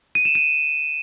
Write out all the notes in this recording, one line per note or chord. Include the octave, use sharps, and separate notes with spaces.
D#7
E7
D#7